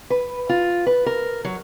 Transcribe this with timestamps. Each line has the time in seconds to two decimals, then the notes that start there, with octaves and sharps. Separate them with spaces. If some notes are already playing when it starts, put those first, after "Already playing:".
0.10 B4
0.49 F4
0.86 B4
1.06 A#4
1.45 F#3